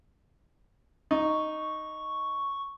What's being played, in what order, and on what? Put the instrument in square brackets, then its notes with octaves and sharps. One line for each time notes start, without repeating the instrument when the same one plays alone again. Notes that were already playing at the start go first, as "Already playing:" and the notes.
[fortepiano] D#4 [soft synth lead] C#6